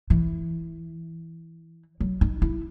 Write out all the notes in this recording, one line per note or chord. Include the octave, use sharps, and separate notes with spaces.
E3
F#3
D#4
E4